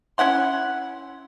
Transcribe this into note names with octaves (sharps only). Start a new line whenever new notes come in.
C#4 E4 F#5 C6